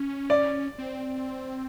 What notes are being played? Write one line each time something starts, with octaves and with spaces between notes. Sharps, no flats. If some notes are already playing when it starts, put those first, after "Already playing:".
Already playing: C#4
D5
C4